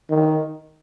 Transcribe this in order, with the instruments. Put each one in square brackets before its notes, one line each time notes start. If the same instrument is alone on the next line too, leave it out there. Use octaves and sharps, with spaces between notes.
[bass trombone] D#3